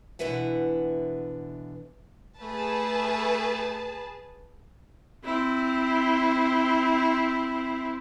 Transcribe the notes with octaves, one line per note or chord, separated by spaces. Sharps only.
B2 D3 E3 B4 E5 F#5
A3 G#4 B4 A5
C4 E4